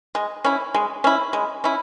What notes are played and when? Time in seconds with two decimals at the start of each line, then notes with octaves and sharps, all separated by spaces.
0.15 G#3
0.45 C#4 E4
0.74 G#3
1.04 C#4 E4
1.33 G#3
1.64 C#4 E4